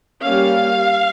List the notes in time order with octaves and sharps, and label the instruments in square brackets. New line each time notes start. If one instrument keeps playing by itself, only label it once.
[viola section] G3 A#3 C#4 F5